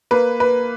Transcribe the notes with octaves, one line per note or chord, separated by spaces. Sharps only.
A#3 B4
B4